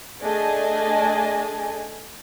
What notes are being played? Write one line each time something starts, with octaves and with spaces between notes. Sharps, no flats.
A3 D4 G#4 D#5 G#5